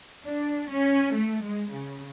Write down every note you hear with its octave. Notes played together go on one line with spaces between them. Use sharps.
D4
C#4
A3
G#3
C#3